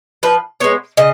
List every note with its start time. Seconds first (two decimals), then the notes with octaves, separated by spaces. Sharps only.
0.23 F3 B4
0.60 G#3 B3 C#5
0.97 C#3 D#5